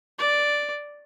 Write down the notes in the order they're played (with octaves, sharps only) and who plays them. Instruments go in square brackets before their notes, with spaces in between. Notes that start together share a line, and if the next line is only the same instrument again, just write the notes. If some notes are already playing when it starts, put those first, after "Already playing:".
[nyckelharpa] D5